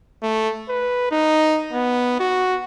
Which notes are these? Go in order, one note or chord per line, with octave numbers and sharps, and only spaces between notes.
A3
B4
D#4
B3
F#4